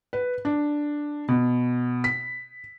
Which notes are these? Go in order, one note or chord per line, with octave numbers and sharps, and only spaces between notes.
B4
D4
B2
B6